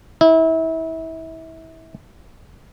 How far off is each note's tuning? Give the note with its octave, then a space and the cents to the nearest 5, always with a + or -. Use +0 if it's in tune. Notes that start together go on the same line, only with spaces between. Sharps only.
E4 -30